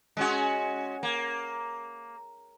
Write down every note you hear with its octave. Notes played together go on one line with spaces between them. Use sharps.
G#3 C#4 F#4
A#3